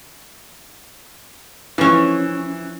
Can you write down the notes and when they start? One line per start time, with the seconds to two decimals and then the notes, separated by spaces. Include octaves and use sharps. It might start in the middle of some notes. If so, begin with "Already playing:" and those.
1.78 E3 F3 C#4